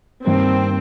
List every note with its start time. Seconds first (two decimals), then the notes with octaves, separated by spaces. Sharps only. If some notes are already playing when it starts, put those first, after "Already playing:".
0.25 G2 D#3 A#3 C4